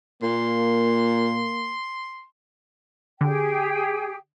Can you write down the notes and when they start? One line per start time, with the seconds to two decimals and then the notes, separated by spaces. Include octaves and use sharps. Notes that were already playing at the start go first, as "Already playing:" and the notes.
0.23 A#2 A#3 C6
3.21 D3 G4 G#4 G5